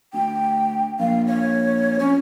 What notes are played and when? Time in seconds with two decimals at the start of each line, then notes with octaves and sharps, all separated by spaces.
0.13 D2 G5
0.99 A#1 F5
1.26 C#5
1.99 F2 C#4